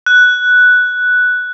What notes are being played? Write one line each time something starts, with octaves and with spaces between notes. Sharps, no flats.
F#6